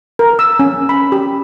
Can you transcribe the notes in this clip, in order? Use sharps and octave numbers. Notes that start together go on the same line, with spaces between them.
A#4
E6
C#4
B5
G4